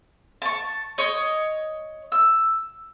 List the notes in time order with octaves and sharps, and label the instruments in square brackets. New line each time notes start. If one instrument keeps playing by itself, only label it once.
[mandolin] A5 C#6
C#5 D#5
E6